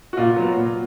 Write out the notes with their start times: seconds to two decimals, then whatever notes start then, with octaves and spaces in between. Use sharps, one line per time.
0.13 F#4
0.17 A#2 F4
0.37 F#3 B3
0.57 A#2